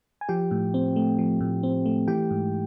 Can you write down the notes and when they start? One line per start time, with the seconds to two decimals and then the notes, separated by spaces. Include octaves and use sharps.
0.21 G#5
0.29 F3 G4 G5
0.51 A2
0.74 C4
0.96 A3
1.18 F3
1.40 A2
1.63 C4
1.86 A3
2.08 E3 G4 G5
2.31 G#2